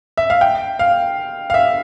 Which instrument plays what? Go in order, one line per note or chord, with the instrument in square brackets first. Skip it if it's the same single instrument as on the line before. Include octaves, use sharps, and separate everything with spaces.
[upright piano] E5
F5
G5
F5
F5
E5